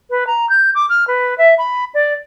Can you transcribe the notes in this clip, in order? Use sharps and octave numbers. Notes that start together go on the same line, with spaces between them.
B4
A#5
G6
D6
F6
B4
E5
B5
D5